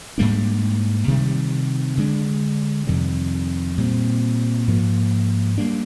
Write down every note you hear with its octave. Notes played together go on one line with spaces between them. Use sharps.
G#2 G3 A#3 D4
C3 D#3 G3
D3 G#3 D4
F2 C3 D#3 G3
A#2 G3 C4
G#2 F3 A#3
G3 A#3 D4